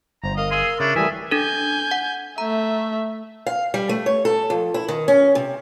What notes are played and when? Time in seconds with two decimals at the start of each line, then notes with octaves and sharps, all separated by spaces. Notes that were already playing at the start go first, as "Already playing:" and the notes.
0.24 G1 C5 A#5
0.37 A#4 D#5 F5
0.51 G#4 F5 C6 E6
0.80 C#3 D4 E4 C#5
0.96 E3 G3 A3 E5 G#5 D#6
1.31 D4 A4 G#5 G6
1.91 F#5
2.38 A3 E5 A#5
3.46 F5
3.74 G3
3.89 A3
4.06 C#5
4.25 A4
4.50 F2
4.74 E4
4.88 D#3
5.08 C#4
5.35 C3